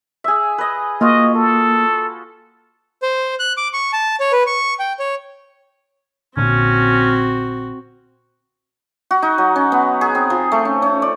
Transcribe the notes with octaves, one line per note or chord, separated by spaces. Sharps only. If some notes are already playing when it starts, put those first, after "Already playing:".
G#4 E5
B4 D#5
A#3 F4 F#4 D#5
A4
C5
F#6
D6
C#6
A5
C#5
B4
C#6
G5
C#5
A#1 A#2 D3 C4 C#4 F#4
F#4
D#4
F#3
C#4
B3
G#4
C4
F3
A3
C#4
C#4
D5